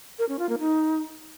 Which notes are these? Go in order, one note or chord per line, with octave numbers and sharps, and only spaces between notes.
A#4
C#4
F4
A#3
D#4